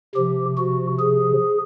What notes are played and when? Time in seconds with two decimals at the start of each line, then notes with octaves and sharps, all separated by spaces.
0.16 C3 F3 G4
0.57 F#4
0.99 G#4